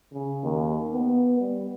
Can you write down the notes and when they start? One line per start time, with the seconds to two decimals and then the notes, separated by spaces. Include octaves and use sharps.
0.13 C#3
0.43 D#2
0.94 B3
1.40 G3